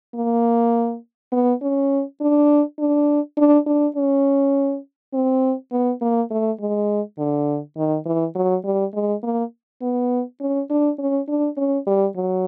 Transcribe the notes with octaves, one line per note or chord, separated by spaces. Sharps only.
A#3
B3
C#4
D4
D4
D4
D4
C#4
C4
B3
A#3
A3
G#3
D3
D#3
E3
F#3
G3
G#3
A#3
B3
C#4
D4
C#4
D4
C#4
G3
F#3